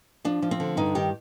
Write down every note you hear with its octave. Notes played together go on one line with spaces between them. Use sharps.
F3 D4
F3
C4
D3
G2 D#4
D#3 G4